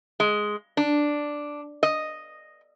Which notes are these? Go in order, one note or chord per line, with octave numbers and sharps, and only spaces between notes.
G#3
D4
D#5